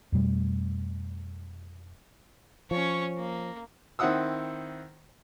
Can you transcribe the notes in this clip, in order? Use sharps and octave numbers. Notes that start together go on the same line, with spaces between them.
F2 B2 G3 A3
F3 C#4 C#5
A#3
D#3 C4 E4 F#5 D#6 E6